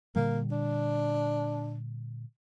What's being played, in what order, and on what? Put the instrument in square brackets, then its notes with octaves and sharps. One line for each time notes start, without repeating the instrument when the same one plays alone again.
[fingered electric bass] A#2 D3 G3 [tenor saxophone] A#3
[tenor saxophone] D4